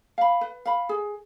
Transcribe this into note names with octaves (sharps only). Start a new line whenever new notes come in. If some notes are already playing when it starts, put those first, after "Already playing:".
F5 B5
B4
F5 B5
G#4